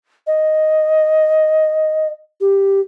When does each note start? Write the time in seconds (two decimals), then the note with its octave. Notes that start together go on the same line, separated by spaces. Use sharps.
0.27 D#5
2.41 G4